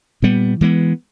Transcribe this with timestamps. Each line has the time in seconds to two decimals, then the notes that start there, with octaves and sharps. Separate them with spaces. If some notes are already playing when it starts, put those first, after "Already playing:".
0.22 A#2 G3 B3
0.61 E3 G#3 B3